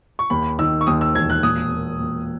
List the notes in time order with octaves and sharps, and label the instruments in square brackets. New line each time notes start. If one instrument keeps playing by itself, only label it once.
[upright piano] C#6
[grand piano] D#2 [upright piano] B5
[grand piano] D#3 [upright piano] E6
[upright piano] C#6
[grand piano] D#2 [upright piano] D#6
[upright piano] E6
[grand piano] E1 [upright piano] G#6
[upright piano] F#6
[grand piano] A#2 [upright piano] D#6
[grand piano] A#3
A#2